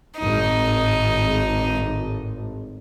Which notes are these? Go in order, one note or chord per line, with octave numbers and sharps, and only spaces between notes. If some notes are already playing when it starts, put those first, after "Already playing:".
G#1 A2 D#4